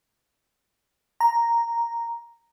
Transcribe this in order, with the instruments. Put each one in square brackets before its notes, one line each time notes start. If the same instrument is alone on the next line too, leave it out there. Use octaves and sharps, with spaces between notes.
[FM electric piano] A#5